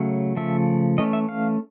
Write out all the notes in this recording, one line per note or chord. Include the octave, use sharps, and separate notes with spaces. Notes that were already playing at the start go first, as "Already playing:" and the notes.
Already playing: C#3 F#3 A3 C#4
C#3 F3 A3 E5
E3 A3 C#4 D#5
E5
F5